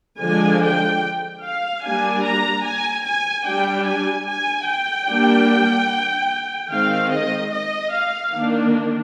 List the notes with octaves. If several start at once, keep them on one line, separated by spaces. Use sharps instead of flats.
D3 F3 G#3 D4 G#5
G5
F5
G3 A#3 D4 G#5
A#5
G#5
G#5
G3 D4 G5
G#5
G#5
G5
G3 A#3 D4
D#3 G#3 C4 F5
D#5
D#5
F5
D#3 A#3 D4